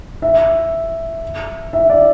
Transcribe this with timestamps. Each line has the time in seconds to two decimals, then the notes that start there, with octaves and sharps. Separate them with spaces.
0.22 E5
1.73 E5
1.90 D5